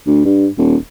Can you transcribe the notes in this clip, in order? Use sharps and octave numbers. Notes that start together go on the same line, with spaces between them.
D2
G2
D#1